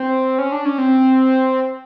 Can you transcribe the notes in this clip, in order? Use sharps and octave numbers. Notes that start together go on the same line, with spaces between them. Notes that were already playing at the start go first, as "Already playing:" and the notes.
Already playing: C4
C#4
D4
C#4
C4